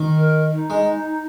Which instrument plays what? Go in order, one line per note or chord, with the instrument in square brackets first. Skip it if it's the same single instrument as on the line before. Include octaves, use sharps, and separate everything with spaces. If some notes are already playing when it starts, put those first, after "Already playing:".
Already playing: [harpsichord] D#3
[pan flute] A#4
D#4
[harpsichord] G#3